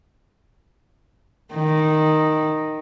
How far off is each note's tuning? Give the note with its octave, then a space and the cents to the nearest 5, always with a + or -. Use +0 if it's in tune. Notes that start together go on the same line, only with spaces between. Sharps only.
D#3 -5